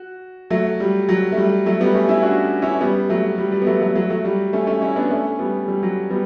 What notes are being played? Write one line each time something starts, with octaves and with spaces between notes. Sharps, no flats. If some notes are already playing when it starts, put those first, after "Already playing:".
Already playing: F#4
F#3 A3
G3
F#3
A3
G3
F#3 A3
G3 B3
A3 C#4
C#4 E4
D4 F#4
C#4 E4
G3 B3
F#3 A3
G3
G3
B3
F#3 A3
F#3 A3
F#3 A3
F#3 A3
G3
A3 C#4
A3 C#4
C#4 E4
B3 D4
A3 C#4
G3 B3
G3
F#3
G3 B3